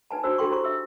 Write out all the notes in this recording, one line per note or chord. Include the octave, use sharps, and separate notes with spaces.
D#4 B4 G#5 A5
D4 F4 F#4 C5 E6
D4 F#4 A4 G5 C6 C#6
E4 G4 A4 C5 C6 C#6
D4 E5 E6